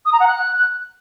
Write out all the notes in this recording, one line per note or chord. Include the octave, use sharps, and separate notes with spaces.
D#6
A#5
F#5
F#6